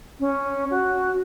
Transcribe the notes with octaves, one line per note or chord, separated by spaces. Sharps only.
C#4
F#4